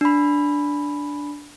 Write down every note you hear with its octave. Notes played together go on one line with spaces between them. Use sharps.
D4 B5